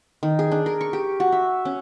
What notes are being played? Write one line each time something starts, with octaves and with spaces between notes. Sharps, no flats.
D#3
G#4
D4
A#4
C#6
G4
F#4
E5
C#4